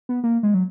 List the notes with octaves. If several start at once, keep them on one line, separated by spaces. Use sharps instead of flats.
B3
A#3
G#3
F#3